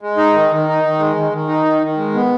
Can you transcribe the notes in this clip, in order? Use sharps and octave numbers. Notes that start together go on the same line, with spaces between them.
G#3
D#4
D#3
D#3
D#4
D#3
G#3
D#3
D#3
D#4
D#3
D#3
G#3
B3